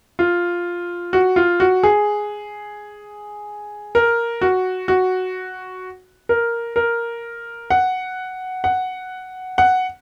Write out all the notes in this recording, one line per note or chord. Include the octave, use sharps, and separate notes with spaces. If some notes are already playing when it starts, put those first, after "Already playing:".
F4
F#4
F4
F#4
G#4
A#4
F#4
F#4
A#4
A#4
F#5
F#5
F#5